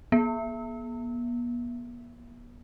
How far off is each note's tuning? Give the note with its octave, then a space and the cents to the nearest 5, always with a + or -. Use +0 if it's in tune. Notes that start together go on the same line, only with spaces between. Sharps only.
B3 -45